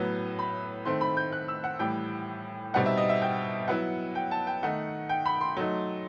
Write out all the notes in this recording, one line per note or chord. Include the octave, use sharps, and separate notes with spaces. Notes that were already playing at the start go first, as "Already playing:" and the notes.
Already playing: A2 F#3 B3
B5
D#3 A3 C4 C6
B5
G6
F#6
E6
F#5
A2 E3 G3 G5
B2 G3 C4 D#4 F#5
E5
D#5
E5
G5
F#3 B3 E4 F#5
G5
A5
G5
D#3 A3 D#4 F#5
G5
B5
C6
F#3 A3 D#4